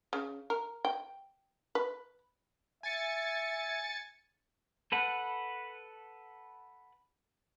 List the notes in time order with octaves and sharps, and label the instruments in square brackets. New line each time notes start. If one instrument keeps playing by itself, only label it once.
[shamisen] C#3
A#4
G5
B4
[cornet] E5 [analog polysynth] G#5 A6 C#7
[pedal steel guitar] A4 B4 F#5